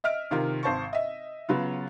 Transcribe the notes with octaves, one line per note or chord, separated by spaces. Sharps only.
D#5 E5 F6 D7
C3 D#3 F4 A#4 C6
G#1 C5 A5 C#6
D#5 E5
C#3 F#3 B3 F4